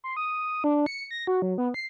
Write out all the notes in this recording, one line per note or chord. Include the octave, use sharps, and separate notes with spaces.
C6
D#6
D4
C#7
A#6
F#4
F#3
B3
C7